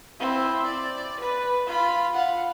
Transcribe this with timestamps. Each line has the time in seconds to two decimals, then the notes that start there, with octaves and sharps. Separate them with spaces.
0.20 C4 E4
0.66 D5
1.20 B4
1.67 F4 B5
2.14 F5 F#5